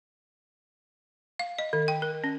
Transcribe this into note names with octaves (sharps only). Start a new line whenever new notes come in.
F5
D#5
D#3
G5
A#4
C#4